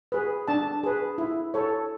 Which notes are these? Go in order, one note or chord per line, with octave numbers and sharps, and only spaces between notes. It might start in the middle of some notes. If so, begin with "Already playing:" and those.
G#4 B4
D4 A5
G#4 B4
E4
A4 C#5